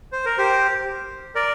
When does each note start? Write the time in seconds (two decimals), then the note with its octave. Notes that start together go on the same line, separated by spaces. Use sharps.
0.12 C5
0.25 A#4
0.38 G4 C5
1.35 A#4 D5